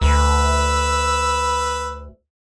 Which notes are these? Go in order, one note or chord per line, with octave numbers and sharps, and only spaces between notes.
D2 B4 E6